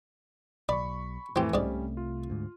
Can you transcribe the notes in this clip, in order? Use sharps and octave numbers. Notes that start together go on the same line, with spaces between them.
B1 D5 B5 C#6
F2 A2 E3 A3 C4 G4
C2 G#2 C3 G3 A3 C#4 D5
F4
D2 G#2